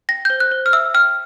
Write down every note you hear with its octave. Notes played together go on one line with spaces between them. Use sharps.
G5 A#6
G6
C5
F#6
C5
F6
E5 E6
G5 F6